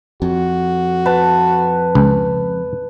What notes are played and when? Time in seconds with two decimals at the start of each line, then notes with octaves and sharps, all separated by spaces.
0.22 F2 F#4
1.06 B4 A5
1.95 C#2